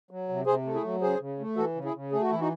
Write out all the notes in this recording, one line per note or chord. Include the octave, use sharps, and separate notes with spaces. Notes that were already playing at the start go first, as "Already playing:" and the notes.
F#3
C3
C3 G#4 C5
A3
E4 G#4
F#3
C#3 G#4 C5
C#3
A3
E3 F#4 A4
C#3
E4 G#4
C#3
A3 G#4
F#4
E3 E4
D#4 F#4